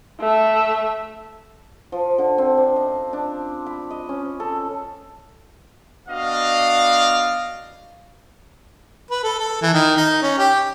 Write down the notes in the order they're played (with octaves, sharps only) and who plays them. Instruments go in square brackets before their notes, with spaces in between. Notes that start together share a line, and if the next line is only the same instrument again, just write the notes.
[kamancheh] A3 E5
[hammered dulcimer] F3
D3
C4
D4
D#5
D4
B5
D#5
C#4
A4
[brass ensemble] B3 D4 F#4 D5 D#5 F5
[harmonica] B4
A4
A4
E3
D#3
D#4
C#4
G4